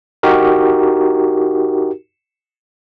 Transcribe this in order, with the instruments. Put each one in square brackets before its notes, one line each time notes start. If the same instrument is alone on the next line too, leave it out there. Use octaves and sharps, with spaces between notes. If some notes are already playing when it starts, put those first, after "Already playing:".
[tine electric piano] D#4 F#4 G4 A#4